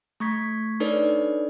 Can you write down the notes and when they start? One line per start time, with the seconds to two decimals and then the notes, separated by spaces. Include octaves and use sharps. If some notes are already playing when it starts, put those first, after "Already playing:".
0.20 A3 C#6 G#6 B6
0.80 D4 D#4 A4 B4 C#5 D5